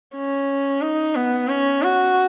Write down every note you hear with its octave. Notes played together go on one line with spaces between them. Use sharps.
C#4
D#4
B3
C#4
F#4